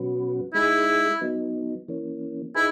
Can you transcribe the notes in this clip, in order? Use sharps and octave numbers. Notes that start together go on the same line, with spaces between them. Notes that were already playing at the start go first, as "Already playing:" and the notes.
Already playing: B2 F#3 C#4 F#4 B4
G#3 D#4 E4 G#4
F#3 B3 D#4
E3 A#3 C#4
D#4 E4 G#4 B4